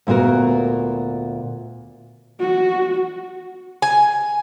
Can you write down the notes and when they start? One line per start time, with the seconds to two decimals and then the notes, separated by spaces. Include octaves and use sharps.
0.07 D2 A#2 B3 F#4 A#4
2.40 F#4
3.82 G#5